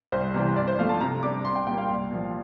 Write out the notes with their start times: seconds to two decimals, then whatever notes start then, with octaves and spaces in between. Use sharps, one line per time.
0.12 C2 C5
0.34 C3 E3 G3 C4
0.56 G2 D5
0.68 C5
0.79 F3 A3 D4 F5
0.89 A5
1.00 C3 A#5
1.23 G3 D4 D6
1.45 C2 C6
1.55 G5
1.66 A#2 G3 A#3 G5
1.78 F5
1.89 C2
2.11 A#2 F3